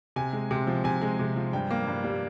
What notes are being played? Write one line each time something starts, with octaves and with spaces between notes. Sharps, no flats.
C3 G#5
G#3
C3
F3
C3 G#5
G#3
C3
F3
G2 G5
A#3
G2
G3